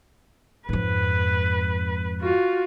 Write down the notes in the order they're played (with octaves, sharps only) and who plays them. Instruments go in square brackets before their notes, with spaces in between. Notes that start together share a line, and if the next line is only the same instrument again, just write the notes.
[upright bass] F2 G#2 [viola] B4
[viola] F4 F#4